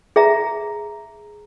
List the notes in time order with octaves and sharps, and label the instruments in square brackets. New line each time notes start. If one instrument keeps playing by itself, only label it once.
[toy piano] G#4 E5 A#5